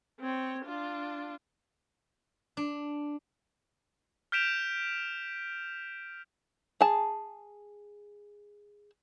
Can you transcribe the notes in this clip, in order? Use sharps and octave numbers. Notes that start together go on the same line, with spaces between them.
C4 C#5
D4 F4
D4
F6 G6 B6 D7 E7 F7
G#4 A5